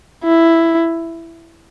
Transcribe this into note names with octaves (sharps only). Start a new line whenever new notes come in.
E4